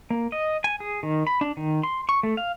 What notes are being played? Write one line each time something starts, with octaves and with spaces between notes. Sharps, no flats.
A#3
D#5
G#5
G#4
D#3
B5
D4
D#3
C6
C#6
A3
F5